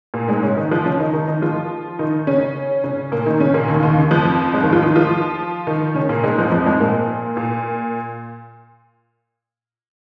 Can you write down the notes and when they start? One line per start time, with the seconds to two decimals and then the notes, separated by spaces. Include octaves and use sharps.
0.14 A#2 A#3
0.29 G#2 G#3
0.42 C#3 C#4
0.56 D#3 D#4
0.71 F3 F4
0.85 C#3 C#4
1.00 D#3 D#4
1.13 D#3 D#4
1.27 D#3 D#4
1.42 F3 F4
1.99 D#3 D#4
2.27 C#3 C#4
2.84 C#3 C#4
3.12 A#2 A#3
3.26 D#3 D#4
3.40 C#3 C#4
3.54 A#2 A#3
3.68 D#2 D#3
3.83 D#2 D#3
3.97 C#3
4.11 F2 F3
4.54 G#2 G#3
4.63 D#2 D#3
4.73 F3 F4
4.82 D#3 D#4
4.96 F3 F4
5.67 D#3 D#4
5.95 C#3 C#4
6.09 A#2 A#3
6.24 G#2 G#3
6.38 F2 F3
6.52 F2 F3
6.66 G#2 G#3
6.80 A#2 A#3
7.37 A#2